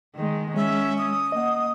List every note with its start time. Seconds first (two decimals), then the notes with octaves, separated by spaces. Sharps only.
0.16 D#3 G#3
0.56 G#3 C#4 E5
0.98 D#6
1.32 A#3 D#5 F#5